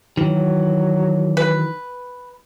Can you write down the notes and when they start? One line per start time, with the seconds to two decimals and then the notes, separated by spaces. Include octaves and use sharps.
0.17 D#3 E3 F#3
1.37 B4